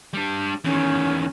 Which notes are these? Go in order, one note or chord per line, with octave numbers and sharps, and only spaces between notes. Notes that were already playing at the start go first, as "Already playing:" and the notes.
G3 D4
E2 D#3 C#4